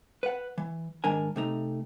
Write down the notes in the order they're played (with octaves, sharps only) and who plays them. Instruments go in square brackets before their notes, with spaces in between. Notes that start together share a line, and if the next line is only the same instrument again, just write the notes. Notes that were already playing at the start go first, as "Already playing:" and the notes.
[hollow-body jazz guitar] B4 F#5
E3
G#2 D#3 D4 A#4 G#5
C3 A3 D#4